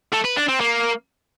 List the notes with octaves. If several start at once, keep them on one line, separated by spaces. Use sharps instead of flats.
A3
B4
D4
C4
A#3